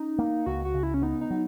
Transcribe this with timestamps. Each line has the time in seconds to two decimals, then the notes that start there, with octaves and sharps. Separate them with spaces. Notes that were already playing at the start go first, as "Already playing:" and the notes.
Already playing: C#4 D#4
0.19 A#3
0.46 C#2 F#4
0.65 F#4
0.74 C#3
0.83 E4
0.94 C#4
1.02 B3 D#4
1.21 D#4
1.30 F#3